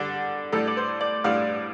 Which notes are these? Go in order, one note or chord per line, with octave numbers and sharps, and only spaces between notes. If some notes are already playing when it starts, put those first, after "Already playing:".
Already playing: D3 G3 D4
A2 G3 D4 A4
D5
C5
D5
A2 G3 D4 F5